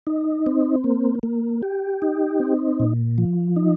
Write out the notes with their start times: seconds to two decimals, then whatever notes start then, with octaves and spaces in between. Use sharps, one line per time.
0.07 D#4
0.46 C4
0.84 A#3
1.23 A#3
1.63 G4
2.02 D#4
2.40 C4
2.80 A#2
3.18 F3
3.56 D#4